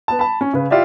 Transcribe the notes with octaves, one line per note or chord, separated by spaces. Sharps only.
B3 A5
A5 B5
C#4
C#3 B4
E4 F4 G4 D5 E5